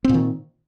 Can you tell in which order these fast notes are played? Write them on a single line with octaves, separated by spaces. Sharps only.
C4 A#2 D#3